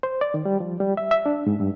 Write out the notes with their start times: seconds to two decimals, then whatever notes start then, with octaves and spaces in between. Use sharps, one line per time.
0.03 C5
0.21 D5
0.34 D#3
0.45 G3
0.60 F3
0.80 G3
0.97 E5
1.11 E5
1.26 D4
1.47 G#2
1.60 G2